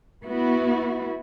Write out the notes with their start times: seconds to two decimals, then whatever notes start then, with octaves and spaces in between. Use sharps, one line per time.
0.25 B3 E4 F#4